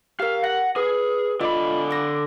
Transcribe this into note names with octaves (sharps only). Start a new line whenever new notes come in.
G4 A#4 F5
F#5 A#6
G#4 B4
D3 F4 D#5 B5 D6
D6 A#6